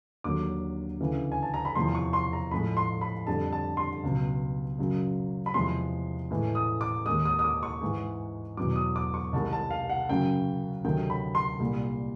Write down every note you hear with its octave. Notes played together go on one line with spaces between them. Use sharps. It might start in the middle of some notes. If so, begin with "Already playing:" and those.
D#2 D3 F#3 D6
D2 C#3 E3
G#5
A5
A#5
B5
E2 C3 F3 C6
C#6
C6
A#5
A2 F3 G#3 B5
C6
B5
F2 D3 G3 A5
A5
C6
C#2 B2 F#3
F#2 C#3 F#3
B5
E2 C3 F3 G#3 C6
A2 E3 G#3
D#6
D6
D#2 D#3 G#3 D#6
D#6
D#6
D6
C#6
G#2 E3 G#3
E2 B2 F#3 D6
D#6
D6
C#6
C2 C3 D#3 G#3 A5
A5
F5
F#5
F#2 C#3 F#3 G5
D2 C3 D#3 F#3 G5
B5
C6
C2 A#2 G3